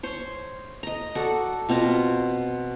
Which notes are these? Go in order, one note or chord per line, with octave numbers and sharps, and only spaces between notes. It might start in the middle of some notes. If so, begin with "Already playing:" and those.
C5 C#5
D#5 A#5
F#4 A4 D5
B2 C4 F4 A#5